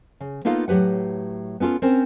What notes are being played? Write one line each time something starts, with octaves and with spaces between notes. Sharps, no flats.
C#3
A#3 B3 D#4 F4 A4 F5
A2 F#3 G4 B4 F#5
B3 C#4 F4 A4
C4 C#4 A#4 C5